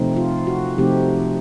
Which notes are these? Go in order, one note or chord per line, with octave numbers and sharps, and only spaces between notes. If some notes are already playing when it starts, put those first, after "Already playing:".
Already playing: C3 F3 A3 C4 D#4
F4
F#4
C3 F3 A3 C4 D#4 G4